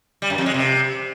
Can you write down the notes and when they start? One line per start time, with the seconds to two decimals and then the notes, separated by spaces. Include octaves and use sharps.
0.22 G3
0.30 F#2
0.38 F2
0.46 G#3
0.54 C3